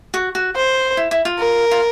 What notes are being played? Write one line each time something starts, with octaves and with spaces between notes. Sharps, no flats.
F#4
F#4
C5
E4
E4
F4
A#4
F4